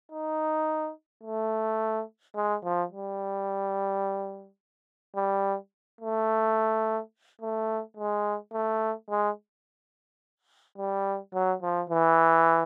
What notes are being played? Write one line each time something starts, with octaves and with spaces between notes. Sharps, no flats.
D#4
A3
G#3
F3
G3
G3
A3
A3
G#3
A3
G#3
G3
F#3
F3
E3